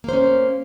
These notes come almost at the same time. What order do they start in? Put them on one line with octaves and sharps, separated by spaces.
A#3 C5 C#4